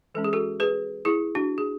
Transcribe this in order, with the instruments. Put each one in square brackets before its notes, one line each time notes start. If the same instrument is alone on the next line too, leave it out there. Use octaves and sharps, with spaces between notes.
[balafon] E3 G#3 C#4 A4
G#4
F#4 A4
G#4 B4
E4 G#4
D4 F#4
G#4